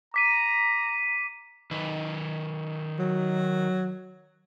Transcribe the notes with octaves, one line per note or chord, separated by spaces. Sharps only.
A#5 D6 B6 D#7
D#3 B4
F#3